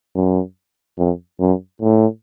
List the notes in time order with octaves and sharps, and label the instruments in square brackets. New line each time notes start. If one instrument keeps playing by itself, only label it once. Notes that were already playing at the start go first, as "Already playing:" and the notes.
[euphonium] F#2
F2
F#2
A2